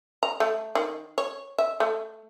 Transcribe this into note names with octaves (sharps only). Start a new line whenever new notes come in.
A#5
A3
D#3
C#5
E5
A3